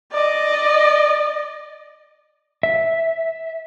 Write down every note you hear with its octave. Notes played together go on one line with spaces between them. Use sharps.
D5 D#5
E5